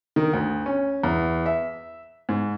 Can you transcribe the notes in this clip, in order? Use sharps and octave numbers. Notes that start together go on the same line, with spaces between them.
D#3
D2
C#4
E2
E5
G#2